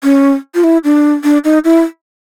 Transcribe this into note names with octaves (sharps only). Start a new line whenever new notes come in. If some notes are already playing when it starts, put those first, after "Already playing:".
C#4
F4
E4
D4
D4
D#4
E4